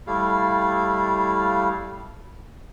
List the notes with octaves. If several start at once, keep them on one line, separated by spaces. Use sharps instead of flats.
G3 A3 E4 F5